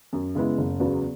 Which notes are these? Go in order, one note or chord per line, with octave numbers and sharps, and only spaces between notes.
F#2
C#3 G#3 B3 E4
F#1
E2 C#3 F#3 B3